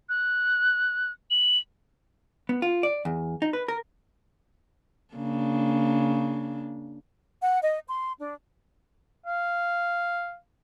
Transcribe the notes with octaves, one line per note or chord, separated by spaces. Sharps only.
F#6
F#7
B3
F4
D5
E2
D#4
B4
A#4
C#3 A#3 D4
F#5
D#5
C6
D4
F5